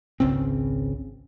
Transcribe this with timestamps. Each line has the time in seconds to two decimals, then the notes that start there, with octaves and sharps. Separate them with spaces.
0.20 G#1 C#2 C#3 C4